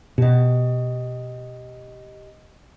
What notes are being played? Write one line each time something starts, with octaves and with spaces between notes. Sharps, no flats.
B2 G4 D#5